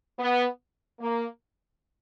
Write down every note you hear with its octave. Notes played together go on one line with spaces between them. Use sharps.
B3
A#3